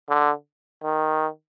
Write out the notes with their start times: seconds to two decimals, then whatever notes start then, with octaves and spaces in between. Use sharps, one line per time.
0.09 D3
0.83 D#3